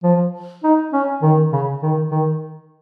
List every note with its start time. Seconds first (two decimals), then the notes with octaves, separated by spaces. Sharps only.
0.04 F3
0.64 D#4
0.93 C#4
1.22 D#3
1.52 C#3
1.83 D#3
2.11 D#3